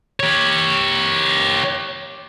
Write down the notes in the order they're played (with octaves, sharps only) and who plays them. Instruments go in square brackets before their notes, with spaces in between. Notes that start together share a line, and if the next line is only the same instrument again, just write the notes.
[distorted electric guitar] G4 C#5